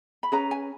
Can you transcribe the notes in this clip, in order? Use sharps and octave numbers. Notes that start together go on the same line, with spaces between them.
B5
C#4 G#4 B4 A#5
G#5